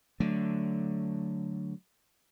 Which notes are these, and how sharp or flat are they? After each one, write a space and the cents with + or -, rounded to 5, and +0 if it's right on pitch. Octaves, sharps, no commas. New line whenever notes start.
D3 +0 F#3 +0 A3 +0